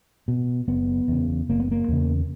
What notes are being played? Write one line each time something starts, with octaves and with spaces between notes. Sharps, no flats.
B2
F#1 B3
E2 C#3
F#1 A#3
B3
A#3
E2 C#3